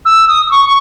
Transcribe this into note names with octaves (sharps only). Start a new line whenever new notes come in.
E6
D#6
D#6
C#6
C#6